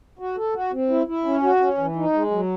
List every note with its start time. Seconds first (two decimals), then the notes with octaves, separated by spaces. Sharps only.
0.19 F#4
0.37 A4
0.54 F#4
0.72 C4
0.89 E4
1.07 E4
1.25 C#4
1.43 F#4
1.60 C#4
1.77 E3
1.96 D#4
2.13 G#3
2.31 F#3